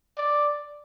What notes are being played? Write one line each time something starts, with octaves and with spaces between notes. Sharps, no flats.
D5